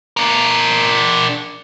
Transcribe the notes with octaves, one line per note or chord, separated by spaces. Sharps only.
D4 A#4